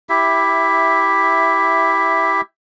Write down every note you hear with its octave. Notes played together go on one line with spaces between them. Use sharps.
E4 G4 E5